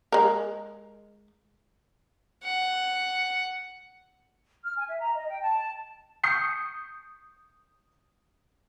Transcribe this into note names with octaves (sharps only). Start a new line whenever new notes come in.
G#3 A#4
F#5
F6
G#5
E5
A#5
D#5
G5
A5
C#6 D#6 G6 C7 C#7